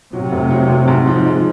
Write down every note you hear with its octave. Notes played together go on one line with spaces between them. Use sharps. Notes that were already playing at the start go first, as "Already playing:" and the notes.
C3 F#3
F1
F#3
F#3
G#2
F3
G#3